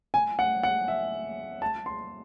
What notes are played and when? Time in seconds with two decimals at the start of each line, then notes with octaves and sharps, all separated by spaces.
0.14 G#5
0.39 F#5
0.63 F#5
0.88 E5
1.62 A5
1.86 C6